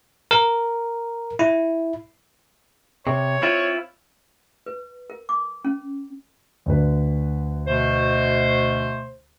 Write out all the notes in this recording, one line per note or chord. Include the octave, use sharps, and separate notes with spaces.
A#4
E4
C3 C#5
C4 E4 F4
B4
A#4
D6
C#4
D2 D3 B4
B2 A3 C5